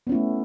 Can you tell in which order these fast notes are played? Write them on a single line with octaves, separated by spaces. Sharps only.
B3 C#4 E4 A3